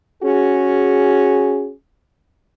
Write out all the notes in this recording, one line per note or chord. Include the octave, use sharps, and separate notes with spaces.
C#4 F#4 G#4